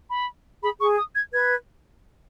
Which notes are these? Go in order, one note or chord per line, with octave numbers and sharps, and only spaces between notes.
B5
G#4 B5
G#4 C#6
D#6
G#6
B4 G#6